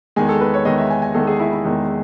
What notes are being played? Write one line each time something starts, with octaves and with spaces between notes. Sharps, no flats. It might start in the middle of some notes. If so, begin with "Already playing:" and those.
E2 D#3 G#3 G#5
A4
B4
C#5
E2 D#3 G#3 D#5
E5
G#5
G#5
E2 D#3 G#3 A4
G#4
E4
E4
E2 D#3 G#3